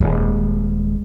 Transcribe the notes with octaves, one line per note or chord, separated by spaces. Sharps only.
D#1 G#3